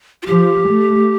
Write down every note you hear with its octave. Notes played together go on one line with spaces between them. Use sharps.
F4
F3 G4
A3